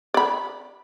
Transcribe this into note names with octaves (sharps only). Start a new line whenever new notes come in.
D5 B5